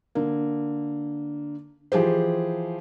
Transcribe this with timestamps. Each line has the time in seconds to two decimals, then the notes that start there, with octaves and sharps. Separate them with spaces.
0.15 D3 A#3
1.92 E3 F3 G4 G#4 C5